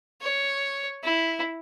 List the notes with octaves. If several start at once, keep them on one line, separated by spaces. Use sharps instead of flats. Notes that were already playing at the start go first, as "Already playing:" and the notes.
C#5
E4